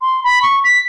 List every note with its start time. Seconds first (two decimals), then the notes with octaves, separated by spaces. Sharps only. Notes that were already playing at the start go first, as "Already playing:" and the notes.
0.02 C6
0.24 B5
0.42 C#6
0.64 B6